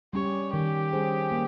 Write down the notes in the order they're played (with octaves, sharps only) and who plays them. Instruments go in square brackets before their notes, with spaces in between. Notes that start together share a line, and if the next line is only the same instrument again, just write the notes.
[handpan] G3 C#4 G4 [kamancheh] C#5
[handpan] D#3 [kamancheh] G4
[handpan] G3 C#4 G#4 C5
A#3